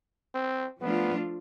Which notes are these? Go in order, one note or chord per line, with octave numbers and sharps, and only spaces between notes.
C4
F3 A3 B3 D4 F4